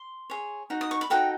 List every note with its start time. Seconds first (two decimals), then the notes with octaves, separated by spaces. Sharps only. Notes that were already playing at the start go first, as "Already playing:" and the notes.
Already playing: C6
0.30 G#4 C#5
0.70 D#4 F#4
0.81 D#6
0.91 C#6
1.01 B5
1.10 D#4 F#4 A4 G5